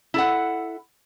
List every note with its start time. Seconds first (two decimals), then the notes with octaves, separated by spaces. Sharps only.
0.14 E4 A4 F#5